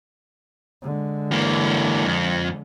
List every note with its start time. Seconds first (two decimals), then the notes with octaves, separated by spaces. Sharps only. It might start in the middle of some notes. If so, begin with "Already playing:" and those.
0.82 D3 G#3
1.32 E3 A#3
2.06 F2